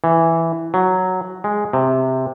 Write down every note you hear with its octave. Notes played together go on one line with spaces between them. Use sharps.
E3
F#3
G#3
C3